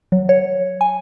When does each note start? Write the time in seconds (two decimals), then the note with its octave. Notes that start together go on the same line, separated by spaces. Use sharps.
0.12 F#3
0.29 C#5
0.81 G#5